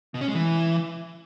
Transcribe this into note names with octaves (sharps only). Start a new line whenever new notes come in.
B2
C#4
G#3
E3